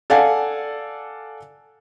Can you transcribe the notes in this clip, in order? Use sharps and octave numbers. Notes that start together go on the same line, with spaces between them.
A4 D5 F5 F#5 G#5